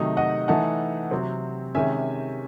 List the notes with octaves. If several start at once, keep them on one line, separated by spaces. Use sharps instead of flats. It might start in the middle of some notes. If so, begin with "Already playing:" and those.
Already playing: C3 D#3 F#3 A3 D#4
D#5 F#5
E3 A3 D#4 F#5 A5
C3 F#3 C4
C3 D#3 G#3 C#4 E5 G#5